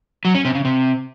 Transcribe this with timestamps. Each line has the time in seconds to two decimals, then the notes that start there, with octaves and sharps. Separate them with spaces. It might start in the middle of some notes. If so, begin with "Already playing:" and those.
0.25 F#3
0.35 C#4
0.45 C3
0.55 C#3
0.65 C3